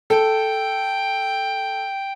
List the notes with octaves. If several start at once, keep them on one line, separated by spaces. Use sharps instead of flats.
A4 G5